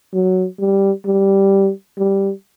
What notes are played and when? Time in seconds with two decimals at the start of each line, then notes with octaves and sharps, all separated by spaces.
0.14 F#3
0.59 G3
1.06 G3
1.98 G3